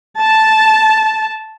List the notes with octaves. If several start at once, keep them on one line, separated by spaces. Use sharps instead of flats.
A5